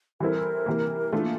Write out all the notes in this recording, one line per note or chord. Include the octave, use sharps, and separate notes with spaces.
E3 G3 C4 E4 A4 A#4
C3 E3 A#3
E3 A3 D4 F4 A4
A#3